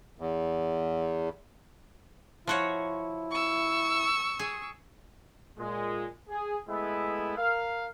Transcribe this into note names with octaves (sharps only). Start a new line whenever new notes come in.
E2
F3 E4 F#4 C#5
C#6 E6
G#4
A#2 G#3
G#4
G#3 A3 B3 E4
A#4 F5